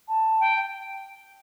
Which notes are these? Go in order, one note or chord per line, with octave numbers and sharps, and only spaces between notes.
A5
G5